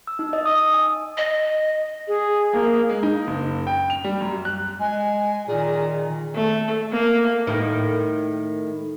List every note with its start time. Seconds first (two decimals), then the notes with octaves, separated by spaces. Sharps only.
0.07 E6
0.19 D#4
0.33 D#5
0.46 D#6
0.74 G#5
1.18 D#5
2.08 G#4
2.53 A#3
2.89 G#3
3.03 D#4
3.27 F#1
3.67 G5
3.90 F7
4.04 G3
4.21 F#2
4.45 F#6
4.80 G#3 G#5
5.48 A#2 D#3 G#4
6.35 A3
6.91 A#3
7.47 A2 D#3